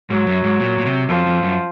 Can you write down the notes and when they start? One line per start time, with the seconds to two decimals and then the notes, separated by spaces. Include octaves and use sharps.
0.10 G#2 F#3
0.26 F#2
0.44 G#2
0.60 A#2
0.78 A#2
0.85 C3
1.09 F2 F3
1.26 F2
1.43 F#2